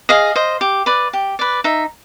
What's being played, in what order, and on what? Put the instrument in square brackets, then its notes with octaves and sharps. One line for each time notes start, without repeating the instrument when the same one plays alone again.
[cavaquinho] G#4 D#5 F5
C5 D#5
G4
B4 D5
G4
B4 D5
D#4 E5